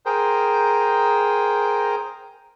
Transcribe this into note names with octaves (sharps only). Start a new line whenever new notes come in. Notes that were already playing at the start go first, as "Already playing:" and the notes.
G#4 A#4 C5 G5